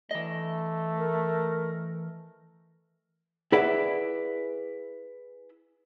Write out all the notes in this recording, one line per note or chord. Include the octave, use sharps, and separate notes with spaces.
E3 A3 D#5
A#4
E4 G#4 B4 D5 E5 F#5